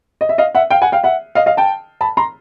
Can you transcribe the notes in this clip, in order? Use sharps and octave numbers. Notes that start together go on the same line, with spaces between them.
D#5
E5
D#5 F5
E5 F#5
F5 G5
F#5 G#5
F5 G5
E5 F#5
D#5 F5
D#5 F5
G5 A5
A5 B5
A#5 C6